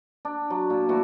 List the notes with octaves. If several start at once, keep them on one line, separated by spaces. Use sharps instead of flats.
D4
F#3
A#2
E3 A3 F#4